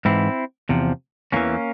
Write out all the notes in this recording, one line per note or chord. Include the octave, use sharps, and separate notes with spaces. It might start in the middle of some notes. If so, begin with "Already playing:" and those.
G#2 E3 C4 E4
E2 C3 F3
E2 E3 A#3 C#4